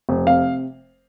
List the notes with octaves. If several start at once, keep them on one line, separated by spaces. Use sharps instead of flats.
F1
C3 F5